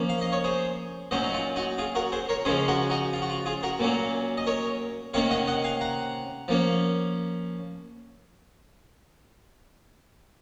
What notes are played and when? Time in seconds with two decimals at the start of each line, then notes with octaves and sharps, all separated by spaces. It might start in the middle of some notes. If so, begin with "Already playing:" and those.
Already playing: F3 A#3 C#4
0.09 F5
0.21 D#5
0.32 C#5
0.44 G#4 C5
1.11 A#2 F#3 C#4 C5 D#5
1.23 D#4
1.34 F4
1.56 D#4 F#4
1.78 F4 G#4
1.95 F#4 A#4
2.12 G#4 C5
2.29 A#4 C#5
2.45 C#3 F3 G#3 C#4 G#4 C5
2.68 F#4 A#4
2.90 D#4 F#4
3.13 F4
3.22 F#4
3.30 F4
3.46 F4 G#4
3.63 F#4 A#4
3.79 A#2 F#3 A#3 C#4
4.37 D#5
4.47 A#4 C#5
5.14 C3 D#3 A#3 C#4 C#5 F5
5.31 D#5 F#5
5.47 D#5 F#5
5.64 F5 G#5
5.81 F#5 A#5
6.48 F3 A#3 C#4